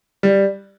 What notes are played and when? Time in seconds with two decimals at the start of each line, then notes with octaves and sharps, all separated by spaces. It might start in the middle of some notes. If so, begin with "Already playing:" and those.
0.23 G3